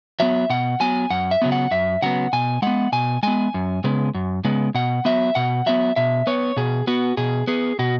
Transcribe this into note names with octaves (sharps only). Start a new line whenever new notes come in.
F#3 B3 E5
B2 F#5
F#3 B3 G#5
F#2 F#5
E5
C#3 F#3 B3
F#5
F#2 E5
C#3 F#3 B3 F#5
B2 G#5
G#3 B3 F#5
B2 G#5
G#3 B3 G#5
F#2
C#3 G#3 B3
F#2
C#3 G#3 B3
B2 F#5
F#3 B3 E5
B2 F#5
F#3 B3 E5
B2 E5
B3 C#5
B2 G#4
B3 F#4
B2 G#4
B3 G#4
B2 F#4